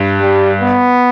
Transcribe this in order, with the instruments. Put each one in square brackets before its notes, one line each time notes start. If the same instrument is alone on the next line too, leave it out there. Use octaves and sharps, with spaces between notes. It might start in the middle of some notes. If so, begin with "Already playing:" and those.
Already playing: [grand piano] G2
[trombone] G3
B3